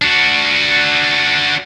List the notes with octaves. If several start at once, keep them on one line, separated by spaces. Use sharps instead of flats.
D4 F#4